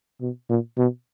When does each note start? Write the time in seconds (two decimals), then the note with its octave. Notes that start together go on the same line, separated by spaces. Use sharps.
0.21 B2
0.49 A#2
0.78 B2